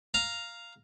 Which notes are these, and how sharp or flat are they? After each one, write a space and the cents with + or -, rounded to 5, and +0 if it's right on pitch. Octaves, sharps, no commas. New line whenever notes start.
F5 +0 A#5 +0